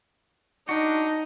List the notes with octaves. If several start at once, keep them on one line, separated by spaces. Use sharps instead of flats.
D4 D#4 F#4